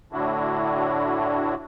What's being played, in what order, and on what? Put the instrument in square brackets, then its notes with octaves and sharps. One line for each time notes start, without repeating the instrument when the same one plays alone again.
[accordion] A2 D3 D4 E4 F#4